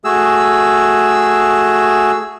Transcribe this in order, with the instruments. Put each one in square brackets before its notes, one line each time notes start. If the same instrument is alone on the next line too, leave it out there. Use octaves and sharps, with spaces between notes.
[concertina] A3 F#4 G#4 E6